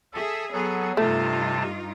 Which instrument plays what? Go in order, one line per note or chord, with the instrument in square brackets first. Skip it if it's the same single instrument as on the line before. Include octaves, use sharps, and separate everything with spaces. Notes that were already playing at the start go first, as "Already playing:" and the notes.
[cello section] G#4 E5 [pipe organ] A4
[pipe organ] F#3 A4 [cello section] B3 G#4
[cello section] G2 D#4 F4 [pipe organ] C3 A5 [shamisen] A3